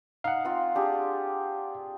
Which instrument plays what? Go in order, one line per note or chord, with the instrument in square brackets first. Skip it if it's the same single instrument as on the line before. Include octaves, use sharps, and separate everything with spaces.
[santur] D#4 [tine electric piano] F5 F#5
[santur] C4 F4
D4 G4 G#4